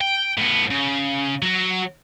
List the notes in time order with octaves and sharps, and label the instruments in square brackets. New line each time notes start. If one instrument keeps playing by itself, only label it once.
[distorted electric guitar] G5
A2 B3
C#3
F#3 F#4